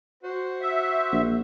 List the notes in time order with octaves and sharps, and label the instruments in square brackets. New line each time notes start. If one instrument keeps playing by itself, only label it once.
[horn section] F#4 C5
[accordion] E5
[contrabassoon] A#1